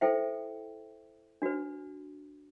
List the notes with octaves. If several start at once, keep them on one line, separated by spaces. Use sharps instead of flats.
E4 A4 C5 E5 G5
D4 F#4 B4